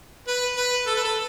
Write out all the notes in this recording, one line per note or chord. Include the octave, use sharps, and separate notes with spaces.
B4
B4
A4
B4
A4